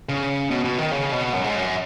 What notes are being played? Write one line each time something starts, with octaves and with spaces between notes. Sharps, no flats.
C#3
B2
B2
D#3
C#3
B2
F#2
G#2
F#2